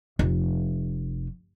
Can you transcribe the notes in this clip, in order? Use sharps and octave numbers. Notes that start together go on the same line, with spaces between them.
F1